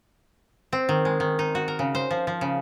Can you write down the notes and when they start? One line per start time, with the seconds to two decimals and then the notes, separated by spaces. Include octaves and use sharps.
0.73 C4
0.89 D#3
1.05 G#3
1.20 D#3
1.39 D#4
1.55 F#4
1.68 A#4
1.79 C#3
1.95 C5
2.11 F3
2.27 F3
2.41 C#3